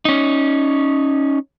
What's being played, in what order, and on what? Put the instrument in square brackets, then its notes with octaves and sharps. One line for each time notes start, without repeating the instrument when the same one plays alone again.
[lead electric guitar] C#4 D#4